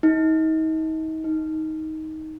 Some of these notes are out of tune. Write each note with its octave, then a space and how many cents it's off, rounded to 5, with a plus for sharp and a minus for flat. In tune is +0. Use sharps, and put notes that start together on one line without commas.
D#4 +35
D#4 +15